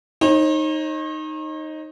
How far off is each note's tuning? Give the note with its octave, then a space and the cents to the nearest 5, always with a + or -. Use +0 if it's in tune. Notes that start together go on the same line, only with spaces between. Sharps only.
D#4 +0 C#5 -45